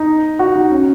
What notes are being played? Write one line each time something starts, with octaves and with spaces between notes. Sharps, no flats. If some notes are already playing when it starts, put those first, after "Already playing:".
Already playing: D#4
F#4
D#4
C#4